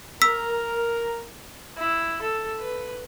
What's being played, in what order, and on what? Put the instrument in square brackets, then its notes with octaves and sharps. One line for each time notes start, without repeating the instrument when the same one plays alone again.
[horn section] A#4 [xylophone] E6 B6
[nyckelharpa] E4
A4
B4